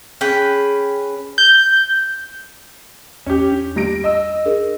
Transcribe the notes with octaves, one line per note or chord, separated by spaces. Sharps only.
C#4 G#4 B4 G5
G6
E2 C#4 G4
D4
G3 A#6 D7
D#5 E6
D4 G#4 A#4